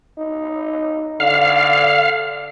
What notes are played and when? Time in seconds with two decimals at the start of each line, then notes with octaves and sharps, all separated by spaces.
0.18 D#4
1.20 D3 F5